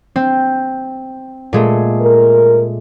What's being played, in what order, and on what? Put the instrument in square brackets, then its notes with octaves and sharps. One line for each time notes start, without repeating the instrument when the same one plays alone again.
[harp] C4
A#2 G#3 A3
[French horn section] A#4